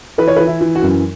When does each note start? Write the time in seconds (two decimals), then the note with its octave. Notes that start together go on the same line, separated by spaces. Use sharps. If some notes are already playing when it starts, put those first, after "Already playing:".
0.18 E3 B4
0.28 C#5
0.36 B4
0.39 E3
0.47 E4
0.61 E3
0.75 F#4
0.82 F#2